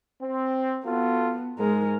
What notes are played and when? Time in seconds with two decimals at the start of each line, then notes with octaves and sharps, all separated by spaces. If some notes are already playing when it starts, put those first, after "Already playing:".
0.21 C4
0.85 B3 F4 F#4 A4
1.59 G#2 G#3 A#4